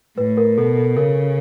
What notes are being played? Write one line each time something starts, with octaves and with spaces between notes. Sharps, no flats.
A2 B4
A#4
B2 A4
A4
C#3 A#4